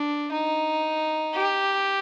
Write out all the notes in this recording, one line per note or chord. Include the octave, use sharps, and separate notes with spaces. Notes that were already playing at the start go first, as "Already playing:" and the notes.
Already playing: D4
D#4
G4